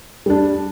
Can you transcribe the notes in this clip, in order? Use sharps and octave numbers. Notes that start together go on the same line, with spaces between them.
G3 D4